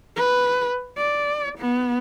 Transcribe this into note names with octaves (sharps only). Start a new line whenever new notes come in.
B4
D5
B3